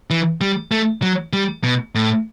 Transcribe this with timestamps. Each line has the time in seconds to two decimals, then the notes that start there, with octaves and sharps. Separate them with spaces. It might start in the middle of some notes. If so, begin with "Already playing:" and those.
0.10 E3
0.41 G3
0.71 A3
1.02 F#3
1.33 G3
1.64 B2
1.95 A2